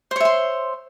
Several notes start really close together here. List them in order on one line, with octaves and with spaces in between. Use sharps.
C5 C#5 E5 C6